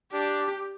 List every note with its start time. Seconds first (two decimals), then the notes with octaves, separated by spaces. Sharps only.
0.13 D4 G4